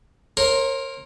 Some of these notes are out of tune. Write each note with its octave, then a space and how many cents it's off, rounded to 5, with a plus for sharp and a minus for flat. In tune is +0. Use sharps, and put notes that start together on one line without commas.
A#4 +0 C#5 -40 C6 +15